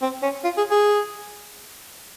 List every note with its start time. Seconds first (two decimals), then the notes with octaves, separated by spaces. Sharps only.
0.02 C4
0.22 C#4
0.44 F4
0.58 G#4
0.71 G#4